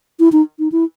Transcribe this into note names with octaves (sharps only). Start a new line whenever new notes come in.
E4
D#4
D#4
E4